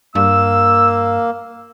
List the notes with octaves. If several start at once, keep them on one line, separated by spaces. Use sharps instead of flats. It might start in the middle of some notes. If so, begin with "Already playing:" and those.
G2 A#3 E6